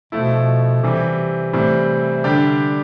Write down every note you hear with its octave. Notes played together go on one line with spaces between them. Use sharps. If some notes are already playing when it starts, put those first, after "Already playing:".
B2 F3 A3 E4
C3 E3 G3 C4 G4
A2 E3 G3 C4
D3 G3 D4 G4